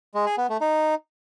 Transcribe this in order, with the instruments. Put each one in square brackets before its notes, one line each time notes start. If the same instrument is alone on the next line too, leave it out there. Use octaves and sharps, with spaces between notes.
[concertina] G#3
G#4
B3
A3
D#4